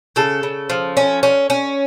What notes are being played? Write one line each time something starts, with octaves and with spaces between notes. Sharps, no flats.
C#3 A4
C#3
F3
C#4
C#4
C#4